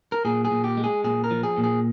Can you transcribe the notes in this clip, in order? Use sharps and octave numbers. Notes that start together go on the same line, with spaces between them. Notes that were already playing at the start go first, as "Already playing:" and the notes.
A#4
A#2 G#4
G#4
A#2
G4
G#3
G#4
A#2 G#4
A#4
F3
G#4
A#2
G#4